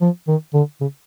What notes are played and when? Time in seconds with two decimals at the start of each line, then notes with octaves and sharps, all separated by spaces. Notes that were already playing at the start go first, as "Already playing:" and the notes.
0.01 F3
0.28 D#3
0.54 D3
0.81 C#3